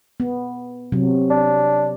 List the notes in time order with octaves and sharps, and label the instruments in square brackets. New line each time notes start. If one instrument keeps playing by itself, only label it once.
[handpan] B3
C3 F#3
[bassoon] D4